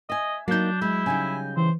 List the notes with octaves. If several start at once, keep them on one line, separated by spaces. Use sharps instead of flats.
D#5 E5 G#5
F#3 A#3 D4 D#4 G6
G#3 E4
C#3 G3 D#4 G#5
E3 C5